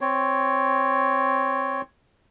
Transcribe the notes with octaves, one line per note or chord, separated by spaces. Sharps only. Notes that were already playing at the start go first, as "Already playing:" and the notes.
C4 C#5